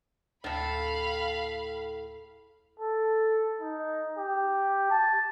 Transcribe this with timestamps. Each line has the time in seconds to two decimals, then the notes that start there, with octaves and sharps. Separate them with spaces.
0.44 D2 A2 A4 F5 B5
2.79 A4
3.61 D#4
4.17 G4
4.91 A5